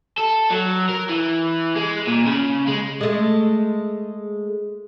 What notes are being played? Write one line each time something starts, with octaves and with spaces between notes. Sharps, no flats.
A4
F#3
A#4
E3
G#3
A#2
C#3
G#3
G#3 A3